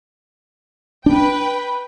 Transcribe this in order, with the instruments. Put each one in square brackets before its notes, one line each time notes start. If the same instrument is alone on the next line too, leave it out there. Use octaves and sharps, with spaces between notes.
[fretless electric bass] D4 [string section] B4 G5